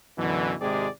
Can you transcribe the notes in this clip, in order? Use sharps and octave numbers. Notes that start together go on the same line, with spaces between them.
F#2 B2 D3 E3
G#1 C3 G#3 G4 G#4 D5